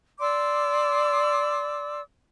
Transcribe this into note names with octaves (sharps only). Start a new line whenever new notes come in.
D5 C6 D6 E6